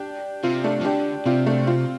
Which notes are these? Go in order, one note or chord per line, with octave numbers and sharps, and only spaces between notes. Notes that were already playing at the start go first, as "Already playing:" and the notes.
Already playing: D4 G4
C3 C4 F4
A3 D4
F3
D3 D4 G4
C3 C4 F4
A3 D4
C4 F4